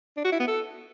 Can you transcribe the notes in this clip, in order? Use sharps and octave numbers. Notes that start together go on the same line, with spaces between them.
D4
F#4
E4
B3
A4